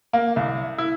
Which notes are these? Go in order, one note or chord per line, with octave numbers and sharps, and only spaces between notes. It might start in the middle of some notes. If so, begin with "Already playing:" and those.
A#3
C2
E4